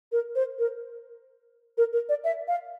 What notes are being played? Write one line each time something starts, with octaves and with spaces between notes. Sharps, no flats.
A#4
C5
A#4
A#4
A#4
D5
E5
F5